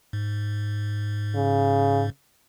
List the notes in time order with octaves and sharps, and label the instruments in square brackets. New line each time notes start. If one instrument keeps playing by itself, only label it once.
[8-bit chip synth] G#2
[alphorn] C#3